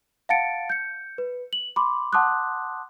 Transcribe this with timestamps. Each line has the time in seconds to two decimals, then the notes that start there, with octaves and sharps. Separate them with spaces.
0.29 F5 F#5 A5 A6 C#7 D7
0.70 G6 C#7
1.18 B4
1.53 F#7
1.76 B5 C6 D6
2.13 F#5 A5 C6 D6 D#6 F#6